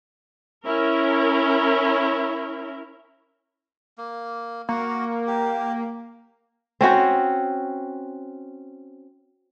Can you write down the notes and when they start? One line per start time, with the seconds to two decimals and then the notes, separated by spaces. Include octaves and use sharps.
0.64 C#4 E4 A#4
3.98 A#3
4.69 A#3 F#4 F#5
5.27 G4
6.81 C4 C#4 F#4 C5